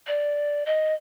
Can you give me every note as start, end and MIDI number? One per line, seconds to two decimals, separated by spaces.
0.07 0.64 74
0.66 0.94 75